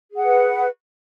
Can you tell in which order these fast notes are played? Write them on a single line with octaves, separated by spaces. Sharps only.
G#4 F#5 B4